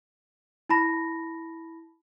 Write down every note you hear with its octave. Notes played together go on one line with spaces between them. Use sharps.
E4 A5 B5 A#6